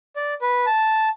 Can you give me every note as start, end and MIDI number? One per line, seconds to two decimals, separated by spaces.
0.16 0.34 74
0.42 0.66 71
0.67 1.09 81